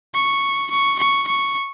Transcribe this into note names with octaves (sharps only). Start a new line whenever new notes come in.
C#6
C#6
C#6
C#6